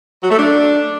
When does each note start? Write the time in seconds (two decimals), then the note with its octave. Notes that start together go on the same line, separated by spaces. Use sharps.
0.22 F#3
0.30 A3
0.37 D4